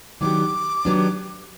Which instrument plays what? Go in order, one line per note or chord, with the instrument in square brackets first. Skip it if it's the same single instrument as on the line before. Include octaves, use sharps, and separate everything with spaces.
[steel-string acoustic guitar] D#3 F#3 B3 D4 G4 [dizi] D6
[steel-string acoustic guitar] D#3 F#3 B3 D4 G4